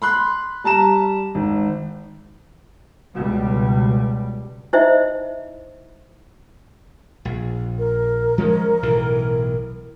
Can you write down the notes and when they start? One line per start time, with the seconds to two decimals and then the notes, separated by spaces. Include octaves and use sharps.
0.02 B5 C6 F#6
0.64 G3 A5 A#5 E7
1.35 G#1
3.16 C#2 B2 G3
4.73 D#4 E4 C5 D#5 E5
7.25 A#1
7.78 A#4
8.38 F3 G#3 C#4
8.83 B1 A2 E3